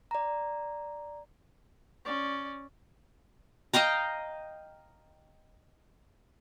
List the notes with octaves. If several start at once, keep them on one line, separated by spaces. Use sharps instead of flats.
D5 A#5
C#4 D5
D#5 F5 G5 A#5